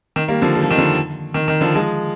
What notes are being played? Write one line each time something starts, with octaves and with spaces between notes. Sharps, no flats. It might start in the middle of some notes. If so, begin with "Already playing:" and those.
D#3
G3 A#3
D3 F3
G3
F3
D#3
D3 F3
D#3
D#3
D3 F3
F3 G#3